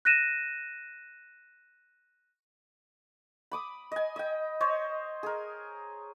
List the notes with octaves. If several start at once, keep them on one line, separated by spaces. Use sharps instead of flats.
F#6 A#6 D#7 E7
B5 D6 D#6
D#5 G#5
D#5 G5
C5 C#5 D#5
G#4 A#4